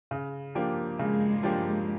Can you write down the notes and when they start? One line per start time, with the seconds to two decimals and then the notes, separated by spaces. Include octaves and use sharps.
0.11 C#3
0.55 F3 A#3 D4 G4
0.99 C#3 G#3
1.43 F3 A#3 D4 G4